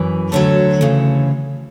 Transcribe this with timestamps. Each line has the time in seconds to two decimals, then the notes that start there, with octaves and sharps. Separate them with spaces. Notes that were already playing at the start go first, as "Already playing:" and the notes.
Already playing: F#2 E3 B4
0.32 D2 D3 F#3 A4 C#5
0.81 D2 C#3 E3